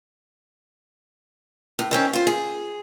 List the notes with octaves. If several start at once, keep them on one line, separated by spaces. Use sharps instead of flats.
A2
D#3 C4 C#4
F4 C5
G#4